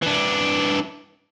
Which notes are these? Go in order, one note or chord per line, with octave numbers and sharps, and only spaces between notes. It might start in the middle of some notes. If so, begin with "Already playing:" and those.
E3 D4